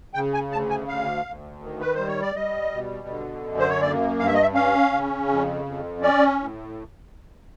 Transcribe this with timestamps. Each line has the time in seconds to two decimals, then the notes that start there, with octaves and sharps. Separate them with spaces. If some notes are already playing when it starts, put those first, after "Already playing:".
0.14 C#3 G5
0.34 G#5
0.51 D2 A5
0.70 G#5
0.88 D2 F5
1.25 D2
1.62 D#3
1.81 B4
1.94 G3 C5
2.07 C#5
2.22 D5
2.35 G3 D#5
2.72 B2
3.08 D3
3.44 F#2
3.58 C5
3.69 C#5
3.81 A#3 D5
4.19 G2 F5
4.26 E5
4.34 D#5
4.42 E5
4.54 C#4 F5
4.92 C#3
5.28 F2
5.65 F2
6.02 C#4 D5
6.39 A2